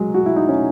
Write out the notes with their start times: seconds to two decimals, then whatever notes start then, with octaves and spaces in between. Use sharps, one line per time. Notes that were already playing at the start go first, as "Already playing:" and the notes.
Already playing: F#3 G#3
0.14 F#4
0.26 E4
0.36 D#4
0.49 C#4